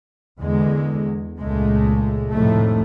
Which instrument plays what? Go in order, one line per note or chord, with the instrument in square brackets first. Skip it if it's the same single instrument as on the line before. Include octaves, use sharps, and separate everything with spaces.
[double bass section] E2 D3 G#3
C#2 A#2 G#3 A3
C2 F2 A2 C3 D#3 A3